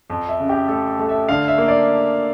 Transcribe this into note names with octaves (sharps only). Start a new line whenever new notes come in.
F2
E5
C#3
G4
A3 A4
A3
E5
D3 F5
E5
A#3
D5